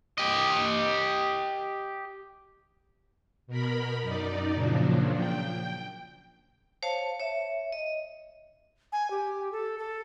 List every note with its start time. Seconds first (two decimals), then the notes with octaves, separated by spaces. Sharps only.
0.18 G4 D#5
3.47 B2 A#4 B5
4.02 F#2 D#4 D5
4.52 A#2 C#3 F3 F#3 D4
5.15 G5
6.83 C5 C#5 F5 A5
7.20 C#5 E5
7.72 D#5
8.92 G#5
9.10 G4
9.52 A4
9.79 A4